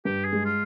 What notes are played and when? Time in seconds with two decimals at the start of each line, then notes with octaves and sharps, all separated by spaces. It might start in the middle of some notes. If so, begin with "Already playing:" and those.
0.05 G2 G4
0.25 G#4
0.33 G#3
0.45 F4